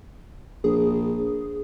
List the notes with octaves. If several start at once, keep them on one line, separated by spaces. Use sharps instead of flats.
A#1 G#4